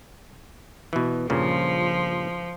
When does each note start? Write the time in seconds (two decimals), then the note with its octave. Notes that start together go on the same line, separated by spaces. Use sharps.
0.93 B2 E3
1.30 G2 A#2 C#3 F3